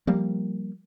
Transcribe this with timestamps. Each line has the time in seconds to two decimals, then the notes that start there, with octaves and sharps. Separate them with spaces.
0.07 F3 G3 A#3